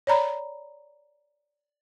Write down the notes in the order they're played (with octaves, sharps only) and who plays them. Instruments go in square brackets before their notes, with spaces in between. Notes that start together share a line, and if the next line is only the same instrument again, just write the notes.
[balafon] C#5 D5 A#5 B5